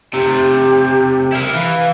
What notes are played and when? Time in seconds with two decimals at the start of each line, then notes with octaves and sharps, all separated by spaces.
0.13 C3 A3 G4
1.32 E4 A#4
1.55 E3 F5